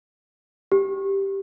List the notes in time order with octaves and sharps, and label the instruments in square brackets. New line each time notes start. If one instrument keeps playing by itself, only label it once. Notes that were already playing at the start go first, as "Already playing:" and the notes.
[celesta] G4